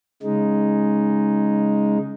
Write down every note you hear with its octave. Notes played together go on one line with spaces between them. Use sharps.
C#3 G#3 D#4